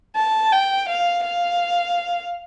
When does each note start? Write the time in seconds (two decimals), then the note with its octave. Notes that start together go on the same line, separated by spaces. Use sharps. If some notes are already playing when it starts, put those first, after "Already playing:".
0.16 A5
0.52 G5
0.89 F5
1.25 F5